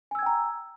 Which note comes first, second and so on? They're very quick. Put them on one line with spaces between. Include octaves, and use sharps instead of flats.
G#5 E6 G#6 G5 A#5